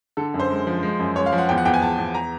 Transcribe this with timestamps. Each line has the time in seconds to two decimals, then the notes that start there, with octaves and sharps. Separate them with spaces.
0.17 D3 A4
0.34 F#2
0.40 C5
0.50 G#3
0.67 F3
0.83 G#3
0.99 F#2
1.16 G#3 C#5
1.26 F5
1.33 F3
1.38 F#5
1.49 E2 G5
1.58 F#5
1.65 E2 G5
1.74 G#5
1.82 E2 A5
1.98 E2
2.15 A#5